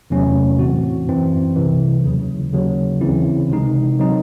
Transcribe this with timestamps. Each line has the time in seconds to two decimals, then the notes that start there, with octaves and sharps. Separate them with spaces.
0.10 E2 C3 F#3 A3 C#4
0.59 A2 E3 C4 F#4
1.08 F#2 E3 C4
1.56 C2 C3 E3
2.04 D#2 C#3 F#3
2.53 D#2 C#3 F#3
3.01 C#2 C#3 E3 C4 E4
3.49 C3 D#3 G#3 D#4
3.99 D#3 F#3 C4 D#4